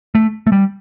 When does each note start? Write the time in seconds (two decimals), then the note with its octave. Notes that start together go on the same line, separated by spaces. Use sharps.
0.15 A3
0.47 A3
0.52 G3